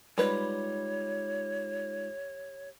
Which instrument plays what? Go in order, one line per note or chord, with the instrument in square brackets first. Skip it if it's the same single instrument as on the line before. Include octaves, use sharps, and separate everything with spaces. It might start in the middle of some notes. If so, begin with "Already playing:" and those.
[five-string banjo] G3 B4 [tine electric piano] G#3 D#4 F4 [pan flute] C#5